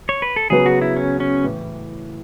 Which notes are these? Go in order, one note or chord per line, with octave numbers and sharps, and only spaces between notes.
C#5
B4
A4
C#3 F#3 B3 G#4
F#4
E4
C#4
C#4
A2 E3